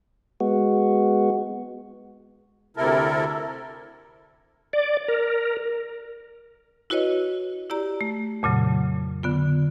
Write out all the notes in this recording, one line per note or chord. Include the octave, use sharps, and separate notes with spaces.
G#3 B3 F#4
D2 C3 E4 A4 A#4
D5
A#4
E4 F#4 B4 C#5 D#5
E4 G4 D5 A#5
A3
F2 A#2 C#3 F#3
D3 B3 F4